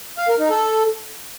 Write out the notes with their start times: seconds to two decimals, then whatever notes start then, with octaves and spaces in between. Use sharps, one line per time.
0.18 F5
0.28 A#4
0.39 D#4
0.50 A4